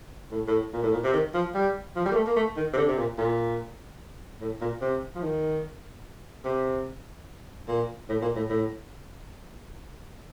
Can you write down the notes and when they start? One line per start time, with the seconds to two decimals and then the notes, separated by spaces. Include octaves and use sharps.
0.31 A2
0.47 A2
0.73 A#2
0.83 A2
0.93 A#2
1.04 C3
1.13 D#3
1.34 F3
1.54 G3
1.96 F3
2.05 G3
2.11 A#3
2.16 A3
2.26 A#3
2.36 A3
2.57 D#3
2.74 C3
2.77 D3
2.87 C3
2.98 A#2
3.18 A#2
4.41 A2
4.61 A#2
4.81 C3
5.15 F3
5.22 D#3
6.45 C3
7.68 A#2
8.09 A2
8.22 A#2
8.35 A2
8.50 A2